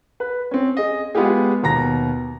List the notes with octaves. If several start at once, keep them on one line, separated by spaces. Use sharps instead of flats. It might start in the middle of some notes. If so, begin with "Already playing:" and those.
B4
C4 C#4
G#4 D#5
G#3 B3 F4 G4 G#4
D#2 B2 A#5 A#6